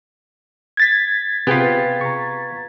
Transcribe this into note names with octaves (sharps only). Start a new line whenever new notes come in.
G#6 A6 B6
C3 B3 F4 G#4 G5
A#5 C#6